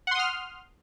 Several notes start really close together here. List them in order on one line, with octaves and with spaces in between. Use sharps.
F#5 C6 D#6 F6